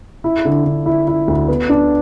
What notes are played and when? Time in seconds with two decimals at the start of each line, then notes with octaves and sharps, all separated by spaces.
0.24 E4
0.45 D3
0.65 D3
0.86 E4
1.08 E4
1.28 D2
1.48 B3
1.69 D4